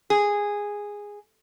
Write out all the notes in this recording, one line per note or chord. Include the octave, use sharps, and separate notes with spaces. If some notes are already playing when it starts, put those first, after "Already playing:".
G#4